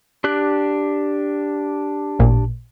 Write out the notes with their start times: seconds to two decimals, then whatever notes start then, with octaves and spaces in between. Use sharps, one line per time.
0.24 D4 G4 F#6
2.19 A1 A#2